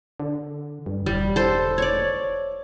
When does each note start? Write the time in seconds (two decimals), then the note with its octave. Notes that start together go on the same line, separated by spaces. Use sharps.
0.20 D3
0.86 G2
1.06 E1 G3
1.36 A4 C5
1.78 C#5 D5